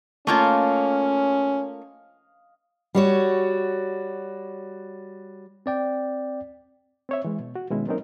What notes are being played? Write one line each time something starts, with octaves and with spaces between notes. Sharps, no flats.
A3 A#3 C#4 F4 D#5 F5
G3 F#4 C#5
C4 D5 G5
C4 C#5 E5
E3 G#3
B2
F#4
B2 D#3 G#3 C#4 E4
F#3 A#3 C4 C#4 D#4 A#4